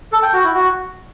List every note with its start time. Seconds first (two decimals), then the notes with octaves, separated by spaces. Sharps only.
0.12 A4
0.23 G5
0.33 F#4
0.44 E4
0.54 F#4